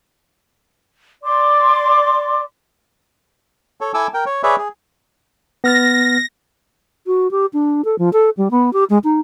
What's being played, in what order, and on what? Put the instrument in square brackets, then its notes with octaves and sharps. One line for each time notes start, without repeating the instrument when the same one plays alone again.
[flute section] D5 C6 D6
[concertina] A4 C#5
E4 A4 G#5 D6 E6
A#4 G5
C#5
G#4 B4 C#5 D5 E5
G#4
[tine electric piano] B3 F6 A6 [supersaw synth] A#6
[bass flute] F#4
G4
D4
A4
F3
A4
G3
B3
G4
G#3
D#4